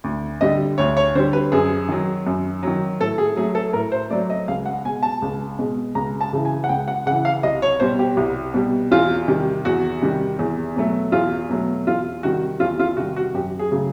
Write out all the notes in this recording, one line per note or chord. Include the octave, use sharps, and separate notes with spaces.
D2
D3 G3 D#5
D2 C#5
C#5
D3 G3 C5
B4
F#2 G#4
D#3 F#3
F#2
D#3 F#3
A2 A4
G#4
F#3 A3 G#4
A4
A2 A#4
C5
F#3 A3 D5
D#5
C#2 F5
F#5
B2 G#3 G#5
A5
C#2
B2 G#3
C#2 A#5
A5
C#3 E3
G#5
F#5
C#2 G5
F#5
C#3 E3 F#5
F5
C2 D#5
C#5
B2 G3 C5
G4
C2
B2 G3
E2 F4
C3 D#3 G3
E2 F#4
C3 D#3 G3
E2
B2 F#3 A3
E2 F4
B2 F#3 A3
E2 F4
C3 D#3 G3 F#4
E2 F4
F4
C3 D#3 G3 F#4
F#4
F#2 G4
G#4
C#3 F#3 A3